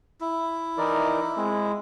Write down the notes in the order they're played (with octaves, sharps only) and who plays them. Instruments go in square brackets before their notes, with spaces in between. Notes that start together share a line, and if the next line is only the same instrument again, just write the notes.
[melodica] E4
[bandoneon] E3 A#4 D5 [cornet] D#4
[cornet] G#3 [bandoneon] C4